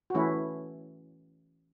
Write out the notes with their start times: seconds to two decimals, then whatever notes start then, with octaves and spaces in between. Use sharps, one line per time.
0.10 F#4
0.15 E3 A3 C#4 E4